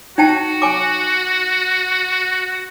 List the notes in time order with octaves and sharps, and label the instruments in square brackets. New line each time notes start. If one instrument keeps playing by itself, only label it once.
[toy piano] D#4 G5 A5 [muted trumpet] F#4
[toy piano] G#5 D6